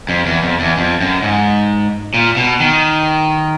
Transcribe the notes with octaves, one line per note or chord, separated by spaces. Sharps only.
F2
E2
F2
E2
F2
F#2
G#2
A#2
B2
D#3